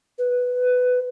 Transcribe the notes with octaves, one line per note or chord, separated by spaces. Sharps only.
B4